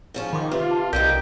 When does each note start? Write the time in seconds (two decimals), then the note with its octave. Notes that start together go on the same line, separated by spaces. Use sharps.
0.14 G#2 F3 C#4
0.33 D#3 B5 C6 D6
0.51 C3 F4 B4 E5 D6
0.71 A5
0.93 C2 D3 F3 D#4 G4 A#4 G5